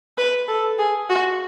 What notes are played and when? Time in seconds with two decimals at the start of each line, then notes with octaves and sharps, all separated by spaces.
0.18 B4
0.48 A4
0.78 G#4
1.09 F#4